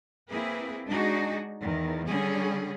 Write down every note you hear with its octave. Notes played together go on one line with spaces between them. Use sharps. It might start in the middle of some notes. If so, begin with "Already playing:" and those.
A#3 C4 E4 G#4 B4
G#3 D4 D#4 F#4 G#4
E2 D#3
D3 G3 C#4 G#4